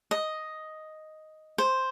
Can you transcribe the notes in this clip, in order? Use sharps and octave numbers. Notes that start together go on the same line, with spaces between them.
D#5
C5